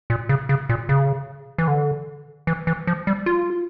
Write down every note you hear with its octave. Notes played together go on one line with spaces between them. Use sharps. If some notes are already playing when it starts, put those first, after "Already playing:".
A#2
C#3
C#3
A#2
C#3
E3
D3
E3
E3
F3
G3
F4